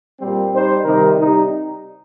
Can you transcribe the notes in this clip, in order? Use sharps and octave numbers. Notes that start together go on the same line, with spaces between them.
A#2 G3 C4
G3 D#4 C5
C3 D#3 G3 D#4 A#4
C3 G3 D#4